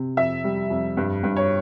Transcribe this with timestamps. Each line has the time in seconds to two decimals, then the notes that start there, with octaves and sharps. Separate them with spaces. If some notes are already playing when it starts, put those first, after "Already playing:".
Already playing: C3
0.17 F2 E5
0.44 G3
0.70 F2
0.97 G2
1.23 G2
1.37 C#5